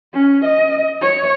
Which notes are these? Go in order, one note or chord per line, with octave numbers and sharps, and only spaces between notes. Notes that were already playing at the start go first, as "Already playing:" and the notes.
C#4
D#5
C#5